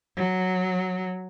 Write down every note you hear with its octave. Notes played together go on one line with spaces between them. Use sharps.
F#3